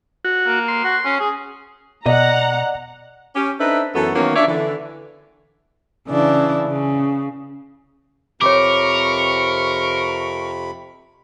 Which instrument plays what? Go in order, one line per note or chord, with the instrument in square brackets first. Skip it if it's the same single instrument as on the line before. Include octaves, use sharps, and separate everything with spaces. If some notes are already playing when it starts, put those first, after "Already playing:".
[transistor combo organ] F#4
[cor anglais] A#3
[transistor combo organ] C6
[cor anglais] F#4
C#4
G#4
[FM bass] B2 [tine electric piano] D5 [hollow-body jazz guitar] D#5 [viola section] F#5 A#5
[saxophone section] C#4 G4
D4 D#4 A4 B4 C5 E5
F#2 E3 B3 F#4 A4
D#3 E3 F#3 A#3 B3 C#4
D4 F4 C#5 D5 E5
D3 E3
[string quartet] C#3 E3 D4
C#3
[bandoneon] F2 C3 B5 [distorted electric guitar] A#4 [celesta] C#5 D6 [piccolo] C#6